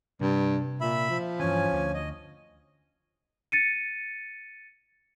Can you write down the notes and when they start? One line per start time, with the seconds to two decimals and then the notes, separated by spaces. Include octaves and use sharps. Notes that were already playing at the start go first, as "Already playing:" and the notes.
0.21 G2 C3
0.81 A#2 E5 B5
1.10 F3
1.40 G2 E3 C#4 G#5
1.72 D2
1.94 D#5
3.52 A6 C#7 D#7